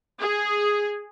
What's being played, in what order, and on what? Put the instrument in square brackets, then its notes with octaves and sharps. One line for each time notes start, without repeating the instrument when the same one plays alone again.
[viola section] G#4